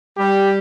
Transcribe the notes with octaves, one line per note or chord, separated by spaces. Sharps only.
G3 G4